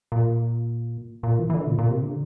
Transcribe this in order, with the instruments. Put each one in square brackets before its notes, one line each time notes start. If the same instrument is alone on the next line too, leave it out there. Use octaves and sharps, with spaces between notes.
[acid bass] A#2
A#2
E3
E3
D3
A#2
A#2
C3
D3